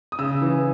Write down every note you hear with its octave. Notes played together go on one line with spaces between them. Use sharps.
D#6
C#3 E6
E3